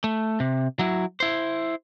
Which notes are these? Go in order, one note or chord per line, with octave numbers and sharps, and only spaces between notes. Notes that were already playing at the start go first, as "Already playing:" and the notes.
A3
C3
F#3 E4
E4 C5